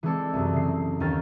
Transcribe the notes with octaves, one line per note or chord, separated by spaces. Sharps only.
E3 G#3 C4 E4 A4 D5
C2 F#2
C#3 C7
D#2 D#3 C#4 G5 F6 A6